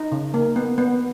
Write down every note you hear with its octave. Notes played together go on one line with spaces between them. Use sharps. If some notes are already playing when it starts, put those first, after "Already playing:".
Already playing: D#4
C#3
A#3
B3
B3